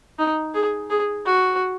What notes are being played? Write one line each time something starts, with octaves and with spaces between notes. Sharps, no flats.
D#4
G#4
G#4
F#4